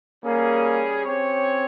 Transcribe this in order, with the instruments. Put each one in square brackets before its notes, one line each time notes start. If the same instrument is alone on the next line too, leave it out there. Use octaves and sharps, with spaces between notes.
[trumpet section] G3 C#4 G#4 [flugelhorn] A#3
[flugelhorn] C4 [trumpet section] C#4 G4 C#5